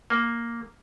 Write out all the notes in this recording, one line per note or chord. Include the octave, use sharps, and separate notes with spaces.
A#3